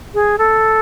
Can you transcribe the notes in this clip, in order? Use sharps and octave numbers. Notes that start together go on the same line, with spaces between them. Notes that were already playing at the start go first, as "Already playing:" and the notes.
G#4
A4